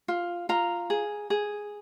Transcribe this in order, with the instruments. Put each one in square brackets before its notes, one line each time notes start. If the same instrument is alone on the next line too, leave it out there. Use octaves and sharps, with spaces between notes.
[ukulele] F4
F4 A#5
G#4
G#4